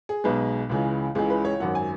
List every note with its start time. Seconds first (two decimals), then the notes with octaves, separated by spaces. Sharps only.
0.09 G#4
0.24 B1 B2 G#3 B4
0.69 C#2 C#3 E3 G#3
1.15 C#2 C#3 E3 G#3 G#4
1.30 B4
1.45 C#5
1.60 G#1 F#2 F#3 F#5
1.75 G#5